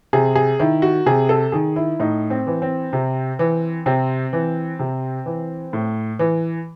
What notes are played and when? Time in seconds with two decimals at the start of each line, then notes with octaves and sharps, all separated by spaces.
0.13 C3 G#4
0.35 G#4
0.59 D#3 E4
0.82 F#4
1.06 C3 G#4
1.29 A4
1.52 D#3 G#4
1.76 E4
2.00 A2 D#4
2.30 C4
2.47 E3
2.62 C4
2.93 C3
3.39 E3
3.86 C3 C4
4.33 E3
4.79 C3
5.26 E3
5.73 A2
6.19 E3